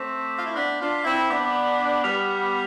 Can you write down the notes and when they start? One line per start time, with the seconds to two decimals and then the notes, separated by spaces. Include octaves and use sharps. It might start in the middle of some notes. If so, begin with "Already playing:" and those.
Already playing: A3 C4 D6 G6 B6
0.38 F4
0.47 E4
0.56 B3 D4 D6 G6 B6
0.81 D4 F4
1.05 C4 E4
1.30 B3 D4 D6 G6 B6
2.04 G3 B3 F6 B6 F7